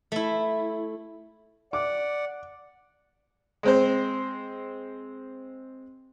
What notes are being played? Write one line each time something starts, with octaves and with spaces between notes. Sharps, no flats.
A3 E4
D5 F#5 D6
G#3 C4 C5